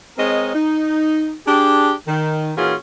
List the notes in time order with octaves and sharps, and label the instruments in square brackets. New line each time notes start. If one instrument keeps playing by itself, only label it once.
[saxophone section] G#3 C4 A#4 C#5 D#5
D#4
D4 G4 G#4
D#3
A#2 E3 C#4 F4 F#4 G#4